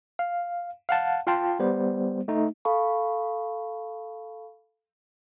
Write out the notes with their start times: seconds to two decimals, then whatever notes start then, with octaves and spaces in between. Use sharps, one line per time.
0.19 F5
0.89 F5 F#5 A5
1.27 F4 F5 G5 A5 C6
1.59 G3 B3 C5
2.28 A3 D#4
2.65 A4 F5 A5 B5 C#6